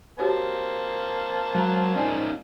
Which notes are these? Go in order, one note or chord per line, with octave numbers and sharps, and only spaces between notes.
A#3 C4 F#4 G4 C#5 A5
F#3 G#3 A#5
C#4 D#4 F4 D5 G#5